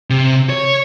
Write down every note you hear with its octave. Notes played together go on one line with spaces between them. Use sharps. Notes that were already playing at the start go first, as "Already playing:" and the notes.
C3
C#5